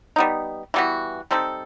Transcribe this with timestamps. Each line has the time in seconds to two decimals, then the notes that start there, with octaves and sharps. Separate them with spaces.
0.16 G3 B3 D#4
0.74 E3 G3 B3 F#4
1.31 G3 C4 D#4 A4